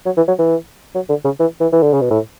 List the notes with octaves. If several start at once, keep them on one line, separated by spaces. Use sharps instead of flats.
F#3
E3
F#3
E3
F#3
D3
C#3
E3
E3
E3
D3
C#3
B2
A2